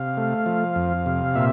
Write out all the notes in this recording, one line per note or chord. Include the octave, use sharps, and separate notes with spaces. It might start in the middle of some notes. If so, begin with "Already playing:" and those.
Already playing: C3 F5
A3
F3
F2
C3
A#2 E5